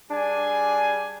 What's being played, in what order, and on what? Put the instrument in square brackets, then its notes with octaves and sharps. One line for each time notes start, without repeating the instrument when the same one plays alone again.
[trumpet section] G3 G#4 G#5 [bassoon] D4